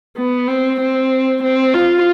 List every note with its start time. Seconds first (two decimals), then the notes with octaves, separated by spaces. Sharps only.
0.17 B3
0.48 C4
0.80 C4
1.43 C4
1.74 F4